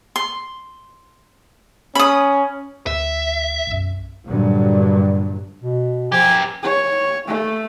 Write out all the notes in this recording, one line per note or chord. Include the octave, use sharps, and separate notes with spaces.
C6
C#4 B5 D#6
D2 E5
B1 F#2
G2 A#2 D3 F#3
B2
F#2 F3 G4 G#5
C#5
A3